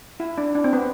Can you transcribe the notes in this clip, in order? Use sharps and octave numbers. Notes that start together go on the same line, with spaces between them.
E4
D4
D4
C4
B3